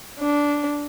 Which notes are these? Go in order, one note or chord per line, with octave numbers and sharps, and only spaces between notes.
D4